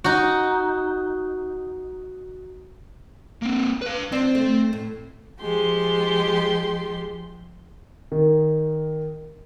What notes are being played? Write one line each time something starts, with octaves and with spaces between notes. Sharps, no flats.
D#4 F#4
A#3 C4
B4 F5
F3 C4 D4
A3
A2
F3 G#3 G4 C6
D#3